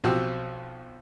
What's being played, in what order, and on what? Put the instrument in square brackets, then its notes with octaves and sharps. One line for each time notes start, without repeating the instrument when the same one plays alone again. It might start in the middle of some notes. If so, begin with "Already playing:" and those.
[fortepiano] B1 F3 C4 F#4 G4 E6